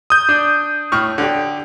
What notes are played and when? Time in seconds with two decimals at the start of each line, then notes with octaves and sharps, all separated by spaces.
0.10 D#6 G6
0.29 D4
0.92 A2 C#6 F6
1.18 D3 G4